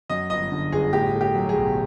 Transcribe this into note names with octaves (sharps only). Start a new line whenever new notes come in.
F#2 D#5
G1 D#5
D3
G1 G#4
A2 G4
A3
G4
F#3
G#4
B1